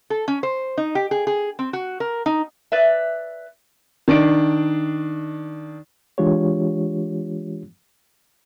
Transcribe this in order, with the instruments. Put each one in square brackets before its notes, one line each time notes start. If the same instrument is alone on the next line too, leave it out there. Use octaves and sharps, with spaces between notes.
[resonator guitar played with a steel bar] A4
C#4
C5
D#4
G4
G#4
G#4
C4
F#4
A#4
D#4
B4 D5 E5
[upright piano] D#3 D4 D7
[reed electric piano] E3 G#3 D4 F4 G4 C#5